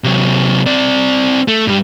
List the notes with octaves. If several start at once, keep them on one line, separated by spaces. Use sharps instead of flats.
C3 F#3
C4 D5
A3
G2 G3